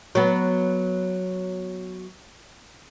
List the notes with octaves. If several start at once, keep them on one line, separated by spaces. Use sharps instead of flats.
F#3 B3